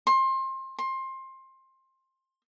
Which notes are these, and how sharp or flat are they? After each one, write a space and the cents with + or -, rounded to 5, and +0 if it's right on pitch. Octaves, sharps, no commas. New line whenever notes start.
C6 +25
C6 +20